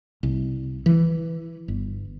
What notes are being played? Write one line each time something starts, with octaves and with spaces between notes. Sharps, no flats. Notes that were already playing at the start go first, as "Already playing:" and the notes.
C2
E3
G1